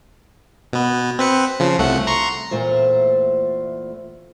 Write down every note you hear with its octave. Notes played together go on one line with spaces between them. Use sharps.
B2 B3
C4 B4 C#7
C#3 F3
C2 A3 F#5
A#5 C6 C#6
E2 A#2 A3 C5